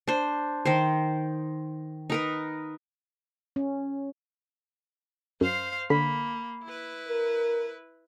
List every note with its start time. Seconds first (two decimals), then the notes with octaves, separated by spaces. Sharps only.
0.08 D4 C5
0.65 D#3 C5
2.10 D#4 A#4 B4
3.56 C#4
5.41 F#2 C5 F5
5.90 D3 A#3 B5
6.64 E4 B4
7.08 A#4